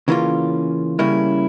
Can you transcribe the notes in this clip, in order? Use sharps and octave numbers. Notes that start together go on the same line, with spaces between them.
C#3 E3 A#3 C#4 F4
C#3 G3 A#3 C#4 E4